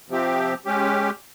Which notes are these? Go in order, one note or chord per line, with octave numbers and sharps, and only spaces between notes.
C3 F3 C4 G4
G#3 C#4 G4